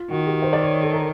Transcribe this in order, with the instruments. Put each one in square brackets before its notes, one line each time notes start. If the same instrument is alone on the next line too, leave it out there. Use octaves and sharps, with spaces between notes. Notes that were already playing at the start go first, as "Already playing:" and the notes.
Already playing: [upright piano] F4
[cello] D#3 [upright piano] F#4
[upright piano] G4
C5
D5
C#5
A4
A#4